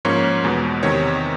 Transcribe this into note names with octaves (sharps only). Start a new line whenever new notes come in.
G#2 F3 A#3 C#4 C#5
E2 B2 G#3
E2 C3 D#3 C#5